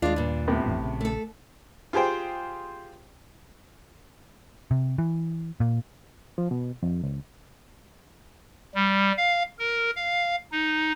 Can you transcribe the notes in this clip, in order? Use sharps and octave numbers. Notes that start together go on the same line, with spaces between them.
D#2 G#3 D4 F4
G2 A#2
A2 C3 B3
A1 F2
A#1 C#3
A3 A4
F4 G4 G#4 C5 G5
C3
E3
A#2
F3
B2
F2
C#2
G3
F5
A#4
F5
D#4